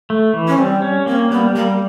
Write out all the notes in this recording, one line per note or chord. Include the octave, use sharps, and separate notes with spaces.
A3
E3
C#4
G3 C4
C#4
A#3 C4
G3 B3
G3 A#3